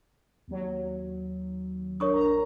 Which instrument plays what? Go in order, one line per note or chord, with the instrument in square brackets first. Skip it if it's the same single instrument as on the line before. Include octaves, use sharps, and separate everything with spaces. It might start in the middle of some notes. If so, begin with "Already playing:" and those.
[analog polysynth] D#2 F#3
[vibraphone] D4 A#4 [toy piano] C#5 C#6 D#6
[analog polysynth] A#1 A#5